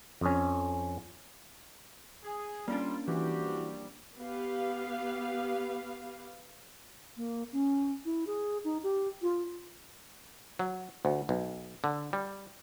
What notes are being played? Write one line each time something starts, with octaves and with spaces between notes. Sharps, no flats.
F2 C#4
G#4
G3 A#3 C#4 D4 F4
E3 F3 G3 F#4 G4
B3 G4 B4 F5
A#3
C#4
E4
G#4
D#4
G4
F4
F#3
D2
B1
D3
G3